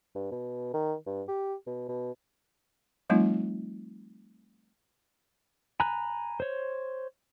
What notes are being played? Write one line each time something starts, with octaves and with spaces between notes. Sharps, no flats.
G2
B2
D#3
G2
G4
B2
B2
F3 G3 A3 C4 D#4 F4
G#5 A#5 B5 F#6
C5 C#5